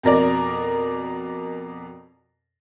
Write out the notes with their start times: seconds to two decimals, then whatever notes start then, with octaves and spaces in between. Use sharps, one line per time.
0.03 F2 B2 A#4 D5